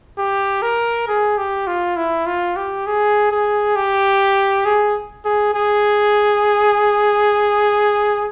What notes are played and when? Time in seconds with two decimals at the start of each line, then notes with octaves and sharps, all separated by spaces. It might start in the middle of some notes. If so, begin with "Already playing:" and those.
0.18 G4
0.62 A#4
1.08 G#4
1.38 G4
1.67 F4
1.96 E4
2.26 F4
2.56 G4
2.86 G#4
3.31 G#4
3.76 G4
4.65 G#4
5.25 G#4
5.54 G#4